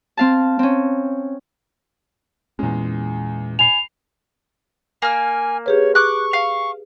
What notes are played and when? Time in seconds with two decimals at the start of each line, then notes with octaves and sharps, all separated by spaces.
0.17 C4 F5 A5
0.59 C4 C#4
2.59 E2 A#2 G#3 C#4
3.59 G#5 B5 C7 F7
5.02 A#3 G#5 F6
5.66 G4 G#4 B4 C#5
5.95 C#6 D6 F#6
6.33 F5